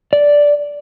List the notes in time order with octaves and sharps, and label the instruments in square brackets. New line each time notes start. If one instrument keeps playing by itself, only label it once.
[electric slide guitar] D5